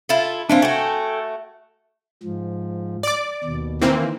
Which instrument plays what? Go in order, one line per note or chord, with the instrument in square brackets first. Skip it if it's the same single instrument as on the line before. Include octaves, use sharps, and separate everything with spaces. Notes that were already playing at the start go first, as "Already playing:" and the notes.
[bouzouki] E4 F4 A4
[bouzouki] E3 E4 F4 [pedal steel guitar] C4 D4
[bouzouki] A3 F#4 [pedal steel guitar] A4 G5 G#5
[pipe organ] G#2 F3
[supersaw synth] D5 D6
[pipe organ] D#2 B2
[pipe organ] D#3 [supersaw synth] E3 A#3 C4